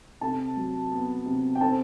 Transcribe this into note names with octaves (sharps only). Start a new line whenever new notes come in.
C3 A4 A5
F#3
B3
C3
G5
C4 A4 A5